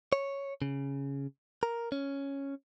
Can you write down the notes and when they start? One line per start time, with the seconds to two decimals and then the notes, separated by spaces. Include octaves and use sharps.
0.13 C#5
0.62 C#3
1.63 A#4
1.92 C#4